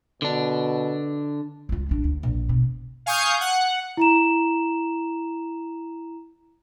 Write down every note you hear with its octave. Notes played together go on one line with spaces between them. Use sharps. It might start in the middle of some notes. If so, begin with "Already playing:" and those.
B2 D3 D4
C#2 F4
A1 D4
D2
A#1
B2
F5 G#5 C#6 D#6 G6
F#5
E4 A#5 E7